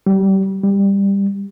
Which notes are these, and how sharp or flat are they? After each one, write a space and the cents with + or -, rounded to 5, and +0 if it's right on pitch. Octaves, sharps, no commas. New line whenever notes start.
G3 -25
G3 +15